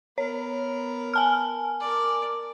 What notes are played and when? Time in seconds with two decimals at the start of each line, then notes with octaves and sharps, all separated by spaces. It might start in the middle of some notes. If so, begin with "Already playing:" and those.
0.18 B3 A#4 C#5
1.13 G#5 A5 F6
1.80 A#4 D5